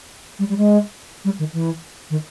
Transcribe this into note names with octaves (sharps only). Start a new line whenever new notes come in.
G3
G3
G#3
G3
D#3
E3
D#3